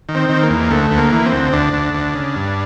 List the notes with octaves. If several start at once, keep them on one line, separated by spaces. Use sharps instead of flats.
D#3
C4
D#3
A#3
E2
D2 A3
D2
A#3
E3
C4
D2
D2 D4
D2
D2
C#3
G2